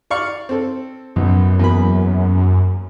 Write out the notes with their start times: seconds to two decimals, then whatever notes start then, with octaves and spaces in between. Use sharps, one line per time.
0.11 D5 F5 C#6
0.49 C4 A4
1.16 B1 F#2
1.60 E2 A#3 B5